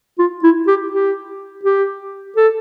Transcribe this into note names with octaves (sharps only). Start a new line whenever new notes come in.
F4
E4
G4
G4
G4
A4